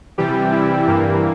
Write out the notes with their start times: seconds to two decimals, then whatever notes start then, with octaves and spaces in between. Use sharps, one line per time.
0.18 C3 E3 G3 G4
0.52 E4
0.86 G2 E3 A#3